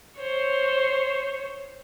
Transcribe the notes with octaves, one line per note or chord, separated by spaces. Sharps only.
C5 C#5